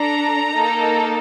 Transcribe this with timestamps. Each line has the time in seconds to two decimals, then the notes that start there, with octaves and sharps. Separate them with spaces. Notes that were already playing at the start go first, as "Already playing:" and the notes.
Already playing: D4 A4 A#5
0.54 A#3 D#4 A4